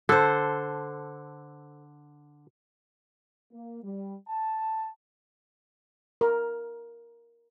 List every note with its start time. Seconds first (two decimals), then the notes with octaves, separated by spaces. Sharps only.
0.09 D3 A4 C5
3.52 A#3
3.83 G3
4.28 A5
6.21 A#4